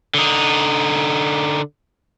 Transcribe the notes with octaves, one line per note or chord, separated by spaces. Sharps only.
D3 D#4